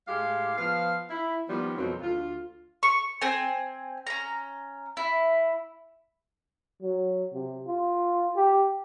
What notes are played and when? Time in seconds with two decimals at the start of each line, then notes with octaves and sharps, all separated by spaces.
0.08 A2 G#3 G4 F5
0.57 F3 B3 F5
1.10 E4
1.49 D#3 F3 G3 B3
1.77 F2 B2 D#3 F#3 C4
2.01 D2 F4
2.83 C#6
3.22 C4 G#5
4.07 C#4 A#5
4.97 E4
6.82 F#3
7.33 C3
7.67 F4
8.36 G4